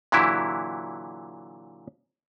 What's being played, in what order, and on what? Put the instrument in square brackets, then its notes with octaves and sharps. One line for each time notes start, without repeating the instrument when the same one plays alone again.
[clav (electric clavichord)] A#2 D3 E3 F#3 E4 G4